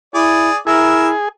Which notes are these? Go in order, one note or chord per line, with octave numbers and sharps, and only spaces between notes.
E4 G#4 D5
E4 G#4 A#4 E5